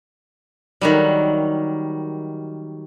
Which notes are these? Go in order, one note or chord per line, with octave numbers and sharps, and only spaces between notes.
D#3 F#3 G3